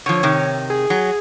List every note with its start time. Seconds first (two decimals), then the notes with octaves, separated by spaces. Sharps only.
0.06 D3 F3 C#5
0.23 C3 D#3
0.70 G#4
0.90 F#3